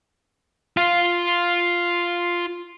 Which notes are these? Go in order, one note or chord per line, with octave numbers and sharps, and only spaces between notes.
F4 F5